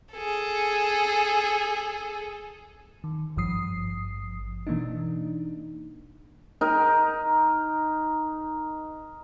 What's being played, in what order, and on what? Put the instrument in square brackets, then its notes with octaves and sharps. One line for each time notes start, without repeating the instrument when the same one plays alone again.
[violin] G#4 A4
[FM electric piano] D#3
G#1 G2 F3 D#6 C7
B2 E3 A#3 D4 D#4
[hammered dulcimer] D#4 A#4